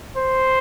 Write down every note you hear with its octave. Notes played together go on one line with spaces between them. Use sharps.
C5